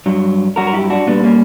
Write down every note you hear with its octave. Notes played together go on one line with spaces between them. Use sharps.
G2 F#3
G2 F#3 F#4 A#4
A#4
E4 G4
D4 F#4
A#2 G3 B3 D4
A#3 C#4